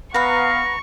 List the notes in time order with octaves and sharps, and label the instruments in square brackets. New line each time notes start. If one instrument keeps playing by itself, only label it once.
[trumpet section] B3 F5 [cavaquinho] B4 F#5 [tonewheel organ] A#5 [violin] C#6